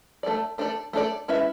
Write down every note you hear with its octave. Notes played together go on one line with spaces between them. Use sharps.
A3 D4 A4 D5
A3 D4 A4 D5
A3 D4 A4 D5
G#3 C#4 E4 B4 E5